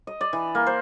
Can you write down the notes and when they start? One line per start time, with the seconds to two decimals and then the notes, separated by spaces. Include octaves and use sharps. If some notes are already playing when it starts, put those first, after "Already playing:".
0.07 D#5
0.21 D5
0.33 E3
0.55 A#3
0.67 C5